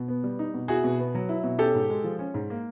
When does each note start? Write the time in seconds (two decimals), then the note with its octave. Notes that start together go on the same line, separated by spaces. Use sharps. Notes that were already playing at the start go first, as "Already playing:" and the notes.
Already playing: B2
0.08 B3
0.24 G3
0.39 D#4
0.54 B2
0.68 E4 F#4 G#4
0.84 B2
0.99 B3
1.15 F#3
1.29 E4
1.44 B2
1.59 C#4 G4 A4
1.74 G#2
1.90 G#3
2.04 F3
2.19 C#4
2.34 G#2
2.50 A#3